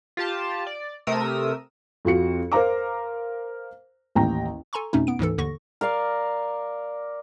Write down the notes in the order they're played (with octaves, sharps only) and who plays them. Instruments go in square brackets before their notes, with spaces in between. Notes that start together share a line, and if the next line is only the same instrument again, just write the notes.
[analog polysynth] F4 G4 A5
D5
C3 A3 A#4 D#6 E6
[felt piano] F2 F4 F#4 C#7
A#4 C5 F5 A#5 D6
A1 D#2 G5 A#5
[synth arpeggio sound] A4 G#5 A#5 C6 C#6
F2 B2 A3 C#4 D#4
B3 D7
D2 G#2 E3 A4
D#2 D3 C#6 A#6
[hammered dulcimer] A#4 D5 F5